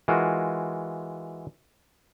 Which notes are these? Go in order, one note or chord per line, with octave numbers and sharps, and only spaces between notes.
E3 G#3 F4 F#4 A#4